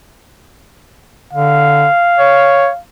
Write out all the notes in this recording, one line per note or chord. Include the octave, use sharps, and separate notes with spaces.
D3 F5
C#5